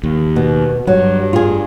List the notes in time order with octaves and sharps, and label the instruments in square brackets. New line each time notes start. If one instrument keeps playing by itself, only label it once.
[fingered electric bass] D#2
[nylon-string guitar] B2
[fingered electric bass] G2 [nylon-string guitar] F#3
[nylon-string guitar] F4 G#4